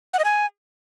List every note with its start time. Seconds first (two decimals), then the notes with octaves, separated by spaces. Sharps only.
0.14 F#5
0.19 D#5
0.25 G#5